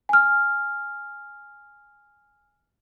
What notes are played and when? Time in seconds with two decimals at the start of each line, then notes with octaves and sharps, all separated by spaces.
0.09 G#5 F6